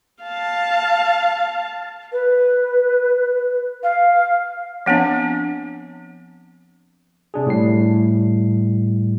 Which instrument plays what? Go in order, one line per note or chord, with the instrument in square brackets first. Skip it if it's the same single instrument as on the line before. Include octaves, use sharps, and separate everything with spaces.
[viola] F5 A5
[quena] B4
F5
[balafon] F3 B3 C4 D4
[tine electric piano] C3 D4 G#4
A2 G3 C7